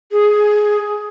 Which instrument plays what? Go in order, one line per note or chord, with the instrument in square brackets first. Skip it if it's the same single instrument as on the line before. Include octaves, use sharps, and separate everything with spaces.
[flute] G#4